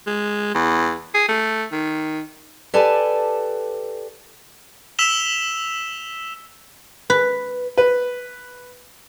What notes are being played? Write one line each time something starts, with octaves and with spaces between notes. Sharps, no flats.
G#3
E2
G#4
A3
D#3
G4 A4 B4 D5 G#5 A5
E6 B6 E7 F7 G7
B4
B4